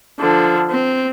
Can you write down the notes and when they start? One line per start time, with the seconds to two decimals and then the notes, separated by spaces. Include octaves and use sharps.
0.19 D3 F3
0.70 C4